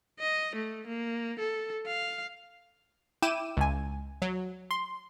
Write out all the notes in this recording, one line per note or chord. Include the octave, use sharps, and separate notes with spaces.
D#5
A3
A#3
A4
F5
E4 G5 D6 D#7 E7
C#2 G#5
F#3
C6